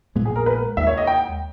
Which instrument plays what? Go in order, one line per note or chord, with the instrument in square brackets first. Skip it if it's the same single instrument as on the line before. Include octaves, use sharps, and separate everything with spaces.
[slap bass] A#1 A#2 G#3 B3
[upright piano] G#4
A#4
B4
[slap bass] D#2 D#3 G#3 [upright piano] E5
[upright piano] C#5
D#5
G5